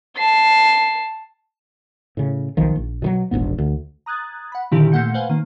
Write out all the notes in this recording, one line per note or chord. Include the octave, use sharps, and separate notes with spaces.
A5 C7
A2 C#3
B1 D#3 F3
A#1
B2 D#3 F#3
E1 A#1 G#2 B3
D2
A#5 D#6 F#6 G#6 A6
F#5 B5
A#2 D3 D#3 C4 E4 G4
A#2 A3 A#3 F#5 G6 C#7
B4 C5 F5 F#5 G#5
D#3 A#3